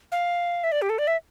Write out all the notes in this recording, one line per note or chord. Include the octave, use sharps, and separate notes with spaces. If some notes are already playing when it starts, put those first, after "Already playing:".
F5
E5
D5
G4
A4
D5
E5